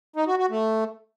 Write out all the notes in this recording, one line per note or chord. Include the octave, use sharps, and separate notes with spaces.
D#4
F#4
F#4
A3